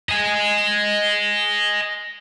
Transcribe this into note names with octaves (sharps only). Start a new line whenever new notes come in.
D#5 G#5